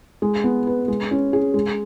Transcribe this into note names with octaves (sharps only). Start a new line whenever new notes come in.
G#3
B3
B4
G#3
C#4
G#4
G#3